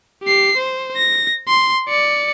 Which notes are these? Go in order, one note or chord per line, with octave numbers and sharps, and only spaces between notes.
G4 C7
C5
A#6
C6
D5 C#7